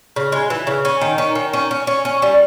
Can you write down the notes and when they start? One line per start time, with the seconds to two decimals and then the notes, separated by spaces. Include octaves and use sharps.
0.16 C#3
0.32 G#3
0.50 E3
0.67 C#3
0.85 C#4
1.01 D#3
1.18 C#4
1.35 D#3
1.53 C#4
1.71 C#4
1.87 C#4
2.05 C#4
2.22 G3